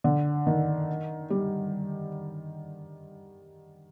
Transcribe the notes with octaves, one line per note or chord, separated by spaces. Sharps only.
D3
D#3
G3